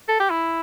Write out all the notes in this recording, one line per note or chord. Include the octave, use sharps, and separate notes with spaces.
A4
G4
E4